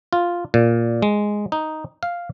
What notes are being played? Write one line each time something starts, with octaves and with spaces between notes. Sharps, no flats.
F4
A#2
G#3
D#4
F5